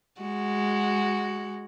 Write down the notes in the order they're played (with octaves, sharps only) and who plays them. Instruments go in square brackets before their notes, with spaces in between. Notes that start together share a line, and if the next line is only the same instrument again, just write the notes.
[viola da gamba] G#3 F#4